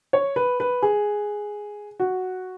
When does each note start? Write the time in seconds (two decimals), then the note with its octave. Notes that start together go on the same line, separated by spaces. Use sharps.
0.13 C#5
0.36 B4
0.60 B4
0.82 G#4
2.00 F#4